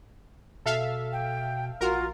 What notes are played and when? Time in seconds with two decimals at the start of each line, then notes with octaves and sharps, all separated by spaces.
0.66 B2 A4 E5 F5
1.12 G5
1.81 A#1 F4 F#4 A#4